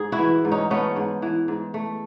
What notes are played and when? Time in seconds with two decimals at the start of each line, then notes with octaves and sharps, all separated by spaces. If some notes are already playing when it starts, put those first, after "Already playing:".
Already playing: G#2 G#4
0.12 E4 F#4
0.19 E3
0.45 G#2
0.52 C#4 D#4
0.70 A3 B3 C#4
0.96 G#2
1.22 E3
1.48 G#2
1.74 A3